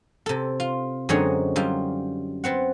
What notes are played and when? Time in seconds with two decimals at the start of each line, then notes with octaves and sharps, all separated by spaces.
0.26 C3 A4
0.60 F4
1.09 F#2 D3 G#3 C4 D#4 C#5
1.56 F#2 G3 F4
2.44 B3 C4 F#5